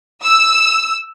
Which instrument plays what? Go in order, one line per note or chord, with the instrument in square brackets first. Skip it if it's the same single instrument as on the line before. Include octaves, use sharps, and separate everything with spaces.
[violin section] E6